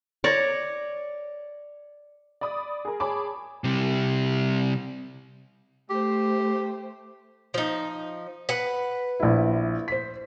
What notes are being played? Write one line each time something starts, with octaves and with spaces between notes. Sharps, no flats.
C#5 D5 A#5
D5 B5 D#6
G#4 A#4
G#4 C#5 A5 B5 D6
C3 G3
A3 G4 C5
F3 D#4
B4 F#5
A#1 E4
C5 B6